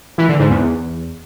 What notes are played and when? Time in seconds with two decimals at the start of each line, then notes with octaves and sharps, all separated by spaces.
0.18 E3
0.29 D3
0.39 G#2
0.50 E2